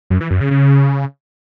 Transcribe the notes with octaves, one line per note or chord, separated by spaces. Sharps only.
F#2
E3
F#2
C#3
C#3